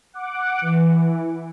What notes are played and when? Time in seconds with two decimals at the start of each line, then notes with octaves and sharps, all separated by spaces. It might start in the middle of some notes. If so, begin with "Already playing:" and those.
0.13 F#5 D6
0.61 E3